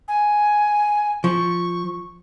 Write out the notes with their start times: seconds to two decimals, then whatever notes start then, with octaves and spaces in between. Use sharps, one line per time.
0.08 G#5
1.24 F3 C#6